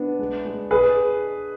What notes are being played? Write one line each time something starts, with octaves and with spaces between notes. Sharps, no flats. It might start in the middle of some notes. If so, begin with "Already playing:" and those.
Already playing: B3 D4
G#3
G#3
G#4 B4